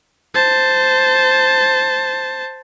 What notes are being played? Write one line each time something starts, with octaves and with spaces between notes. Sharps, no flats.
C5 A5